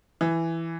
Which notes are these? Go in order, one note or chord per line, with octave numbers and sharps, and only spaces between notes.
E3